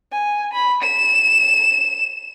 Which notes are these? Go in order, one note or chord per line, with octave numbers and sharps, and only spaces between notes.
G#5
B5
E7